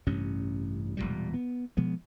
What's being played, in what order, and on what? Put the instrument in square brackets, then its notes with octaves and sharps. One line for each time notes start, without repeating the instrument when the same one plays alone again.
[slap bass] A1 G2 C3 C#4
E1 B1 A#2 G3
B3
B2 F3 G#3 B3